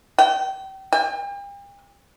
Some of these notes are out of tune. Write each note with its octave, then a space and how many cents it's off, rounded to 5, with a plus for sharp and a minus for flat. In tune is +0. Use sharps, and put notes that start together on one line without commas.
G5 -30
G5 +40